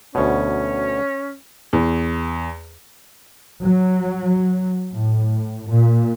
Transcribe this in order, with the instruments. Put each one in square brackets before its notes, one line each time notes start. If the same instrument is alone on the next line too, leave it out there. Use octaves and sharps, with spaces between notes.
[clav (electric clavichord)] D2 B2 [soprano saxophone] C#4
[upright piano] E2
[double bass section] F#3
A2
A#2